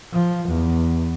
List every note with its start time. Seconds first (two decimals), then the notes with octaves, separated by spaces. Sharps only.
0.13 F3
0.48 E2